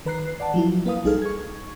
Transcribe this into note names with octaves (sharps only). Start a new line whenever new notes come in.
D#3 B4 A#5 F#6 C7
D5 F#5 A5
F3 F#3 E4
A#3 B4 F5 D#6
B1 G3 D#4 G#4 A4 F6
C#6 G#6